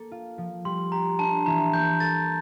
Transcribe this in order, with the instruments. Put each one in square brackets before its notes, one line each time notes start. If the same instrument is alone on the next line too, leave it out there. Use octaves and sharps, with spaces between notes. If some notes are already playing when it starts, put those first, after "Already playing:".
Already playing: [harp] A#3 A4
F4
F3
[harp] G3 [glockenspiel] C6
[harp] G4 [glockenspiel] A#5
[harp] D4 [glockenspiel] A5
[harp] E3 [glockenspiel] A#5
[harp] A#3 [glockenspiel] G6
[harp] A4 [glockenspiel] A6